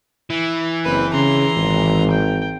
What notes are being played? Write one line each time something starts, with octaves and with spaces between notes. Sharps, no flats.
E3
F#1 C4 B4
C#3 A#5 C6
G#1
G5